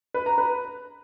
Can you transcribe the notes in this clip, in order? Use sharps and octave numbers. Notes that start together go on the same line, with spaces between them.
B4
A#5
B4